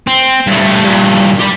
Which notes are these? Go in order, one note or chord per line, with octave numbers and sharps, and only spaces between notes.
C4
G2 A3
G2 A#2
G4 B5